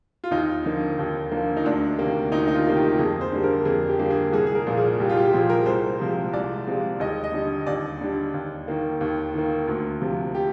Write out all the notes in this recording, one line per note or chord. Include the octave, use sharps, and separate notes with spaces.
F4
D#2 D#4
D3 F3 A#3
D#2
D3 F3 A#3
D#4
D2 D4
C3 D#3 A#3
D2 D#4
D#4
F4
C3 D#3 A#3
G4
F2 G#4
C5
D3 G3 A#3
A#4
F2 G#4
G4
D3 G3 A#3
G#4
C2 G#4
G#4
A#4
A#2 F3
G#4
C2 G4
F4
G4
G4
A#2 F3 G#4
A#4
C2 C5
C3 F3 G#3
C2 D5
C3 F3 G#3
D#2 D#5
D#5
D3 G3
D#2 D5
D3 G3
D#2
D#3 A#3
D#2
D#3 A#3
D2
C3 F3
G4